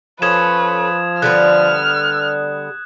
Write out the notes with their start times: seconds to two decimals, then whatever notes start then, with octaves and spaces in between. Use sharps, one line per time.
0.22 F3 C#4 A4 B4 D#6 G#6 E7
1.22 D3 G3 B3 F6 F#6